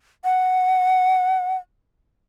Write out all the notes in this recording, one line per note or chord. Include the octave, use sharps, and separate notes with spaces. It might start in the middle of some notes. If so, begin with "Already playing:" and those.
F#5